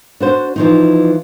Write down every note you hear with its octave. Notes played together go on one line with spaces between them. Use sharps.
D4 F#4 C5
E3 F3 D#4